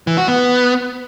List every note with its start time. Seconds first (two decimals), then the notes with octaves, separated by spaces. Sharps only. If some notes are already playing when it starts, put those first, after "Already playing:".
0.07 E3
0.18 F#4
0.28 B3